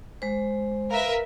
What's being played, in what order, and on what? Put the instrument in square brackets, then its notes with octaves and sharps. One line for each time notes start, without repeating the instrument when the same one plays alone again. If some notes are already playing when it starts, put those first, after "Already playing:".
[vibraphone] G#3 C5
[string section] A#4 B4 E5 [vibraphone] F5